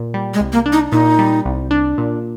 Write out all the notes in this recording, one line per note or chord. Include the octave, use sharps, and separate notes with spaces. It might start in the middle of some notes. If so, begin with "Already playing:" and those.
Already playing: A#2
G3
G#3
C2
A#3
D4
D#4
A#2 D#4
G3
C2
D4
A#2